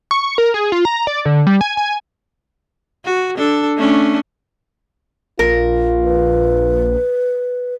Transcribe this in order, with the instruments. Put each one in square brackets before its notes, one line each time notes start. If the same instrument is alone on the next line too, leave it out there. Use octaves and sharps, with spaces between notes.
[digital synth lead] C#6
A#4
G#4
F4
A#5
D5
D3
G3
G#5
G#5
[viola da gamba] F#4
D4 A4
A3 C#4 D4
[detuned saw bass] A#1 [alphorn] F4 [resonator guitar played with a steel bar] A#4
[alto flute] B4